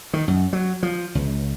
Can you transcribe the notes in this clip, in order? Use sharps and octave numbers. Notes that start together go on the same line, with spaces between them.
D#3
F#2
F#3
F3
C#2